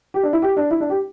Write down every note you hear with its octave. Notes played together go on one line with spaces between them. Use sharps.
G4
D4
E4
G4
D4
E4
D4
G4